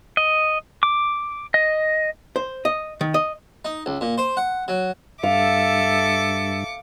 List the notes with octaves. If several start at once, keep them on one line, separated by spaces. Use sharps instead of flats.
D#5
D6
D#5
C5
D#5
D#3
D#5
D#4
C#2
A#2
C5
F#5
F#3
G2 A4 E5 F5 D6 C#7